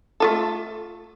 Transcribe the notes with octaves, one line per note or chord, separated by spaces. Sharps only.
A3 F4 A4